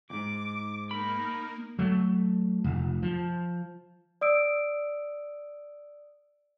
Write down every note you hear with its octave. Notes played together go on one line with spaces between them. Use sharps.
F2 G#2 D6 D7
A#3 D#4 A#4 B5
F#3 A3
F1
F3
D5 D#6 E6 D7